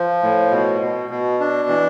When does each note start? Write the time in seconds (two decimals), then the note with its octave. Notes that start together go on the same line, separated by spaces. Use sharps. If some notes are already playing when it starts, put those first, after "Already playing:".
Already playing: F3
0.22 A2
0.51 B2
0.81 B2
1.10 B2
1.40 D4
1.69 E3